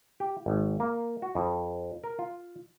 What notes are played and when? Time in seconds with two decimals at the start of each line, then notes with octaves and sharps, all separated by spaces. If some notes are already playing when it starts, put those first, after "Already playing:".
0.20 G4
0.46 G#1
0.80 A#3
1.22 F#4
1.35 F2
2.04 A#4
2.19 F4